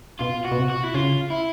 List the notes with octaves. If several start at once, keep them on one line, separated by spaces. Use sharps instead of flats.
B2 F4
F#4
B2
C3
F#4
E4
C#3 F4
E4